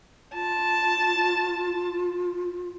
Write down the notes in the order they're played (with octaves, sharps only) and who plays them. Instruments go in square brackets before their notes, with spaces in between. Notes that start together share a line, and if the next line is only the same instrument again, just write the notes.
[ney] F4 [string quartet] A5